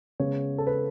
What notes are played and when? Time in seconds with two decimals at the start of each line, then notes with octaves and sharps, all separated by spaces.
0.20 C#3 G#3 B3 C#5
0.58 A4
0.67 B4